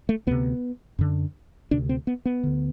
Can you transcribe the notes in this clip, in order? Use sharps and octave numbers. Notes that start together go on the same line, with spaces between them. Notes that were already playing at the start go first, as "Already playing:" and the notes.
A3
D2 C3 B3
F#2 D3
D2 C3 D4
C4
B3
B3
D2 D3